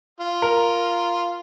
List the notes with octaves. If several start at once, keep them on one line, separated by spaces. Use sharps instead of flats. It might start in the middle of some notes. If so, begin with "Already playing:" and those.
F4
A#4